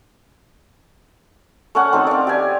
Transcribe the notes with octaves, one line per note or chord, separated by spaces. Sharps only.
A3 C#4 F#5
C4 D#4 A4
D5 F5
G4 D5 G#5